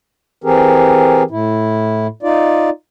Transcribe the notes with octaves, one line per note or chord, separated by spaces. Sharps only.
E3 C4 G4 G#4 A#4
A2 E4
D#4 F4 D5